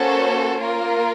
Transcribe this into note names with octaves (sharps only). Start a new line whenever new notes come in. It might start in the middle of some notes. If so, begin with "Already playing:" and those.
Already playing: A#3 C#4 F#4 A4 C5
A#3 F4 A#4